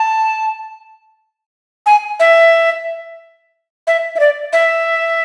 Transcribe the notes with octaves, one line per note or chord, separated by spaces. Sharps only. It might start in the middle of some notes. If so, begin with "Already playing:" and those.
Already playing: A5
G#5
E5
E5
E5
D5
E5